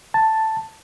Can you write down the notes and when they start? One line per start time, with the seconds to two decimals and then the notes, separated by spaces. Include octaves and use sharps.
0.14 A5